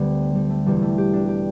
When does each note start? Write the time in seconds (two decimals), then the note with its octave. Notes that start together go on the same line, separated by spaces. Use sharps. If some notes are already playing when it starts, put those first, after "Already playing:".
Already playing: D2 D3 G3 B3
0.35 G3
0.50 A3
0.66 E1 E2 E3 G3
0.82 A3
0.98 G4
1.13 D4
1.29 G4